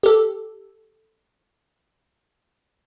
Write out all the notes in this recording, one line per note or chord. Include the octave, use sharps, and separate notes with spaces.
G4 A4